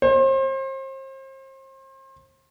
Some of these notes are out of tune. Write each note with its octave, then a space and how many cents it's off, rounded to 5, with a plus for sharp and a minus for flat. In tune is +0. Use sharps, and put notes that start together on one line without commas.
C5 +35